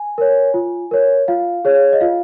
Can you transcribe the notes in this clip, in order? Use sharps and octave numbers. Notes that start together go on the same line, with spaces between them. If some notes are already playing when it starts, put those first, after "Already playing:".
Already playing: G#5
A#4 C#5
F4
A#4 C#5
F4 F5
G#4 C#5
D#5
F4 F5